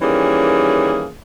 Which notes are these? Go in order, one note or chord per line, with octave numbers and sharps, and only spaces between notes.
D#3 E3 G3 A#3 C#4 G#4